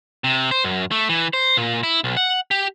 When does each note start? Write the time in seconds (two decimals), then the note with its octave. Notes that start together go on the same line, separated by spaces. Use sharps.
0.24 C3
0.51 C5
0.64 F#2
0.91 A3
1.09 E3
1.33 C5
1.57 A#2
1.83 E4
2.04 B1
2.17 F#5
2.51 G4